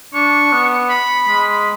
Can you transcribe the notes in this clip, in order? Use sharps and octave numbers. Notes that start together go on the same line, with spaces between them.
D4 C#6
B3
B5
G#3